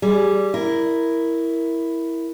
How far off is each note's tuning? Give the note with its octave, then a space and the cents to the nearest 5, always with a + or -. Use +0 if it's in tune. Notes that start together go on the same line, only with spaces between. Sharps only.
G3 -10 G#4 +5
E4 +0 A#4 +0